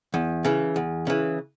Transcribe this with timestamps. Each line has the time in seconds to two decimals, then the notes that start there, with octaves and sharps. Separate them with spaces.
0.14 E2
0.45 C#3 E3
0.76 E2
1.07 C#3 E3